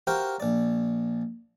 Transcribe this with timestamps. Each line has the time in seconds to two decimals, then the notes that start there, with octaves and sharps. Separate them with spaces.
0.07 F#4 G4 A#4 C5 F5 G5
0.40 A#1 D5